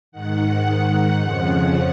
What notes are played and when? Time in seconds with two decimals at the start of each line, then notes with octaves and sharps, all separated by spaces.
0.12 G#2 D#3 F#5
1.20 F2 C#3 F3 F#5